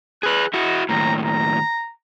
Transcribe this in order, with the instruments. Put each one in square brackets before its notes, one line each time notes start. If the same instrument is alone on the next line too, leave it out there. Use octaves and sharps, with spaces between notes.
[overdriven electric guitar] G#4 B4 [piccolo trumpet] F#6
[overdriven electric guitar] E4 F#4 [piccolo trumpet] D#5
[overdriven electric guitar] D#2 A2 [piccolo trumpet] A#5
[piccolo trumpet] A#5